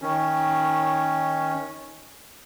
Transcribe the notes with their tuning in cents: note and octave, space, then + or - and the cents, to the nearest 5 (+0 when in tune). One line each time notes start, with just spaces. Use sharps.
D#3 +20 C#4 +0